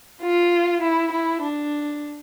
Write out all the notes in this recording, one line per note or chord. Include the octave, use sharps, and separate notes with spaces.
F4
E4
E4
D4